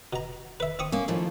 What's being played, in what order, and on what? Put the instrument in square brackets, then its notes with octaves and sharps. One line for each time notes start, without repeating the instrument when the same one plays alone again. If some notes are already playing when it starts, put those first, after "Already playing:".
[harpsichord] B2 A#5
B4 E5
C4 C#6 D#6
[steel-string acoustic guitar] A#3 C#4
D#2 A2 F3